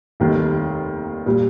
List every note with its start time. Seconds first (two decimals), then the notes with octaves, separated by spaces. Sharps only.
0.20 F1 D#2 D#3 G3
1.26 A#2 G3